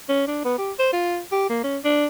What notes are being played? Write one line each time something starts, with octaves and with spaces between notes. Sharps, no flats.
C#4
D4
B3
G4
C5
F4
G4
A#3
C#4
D4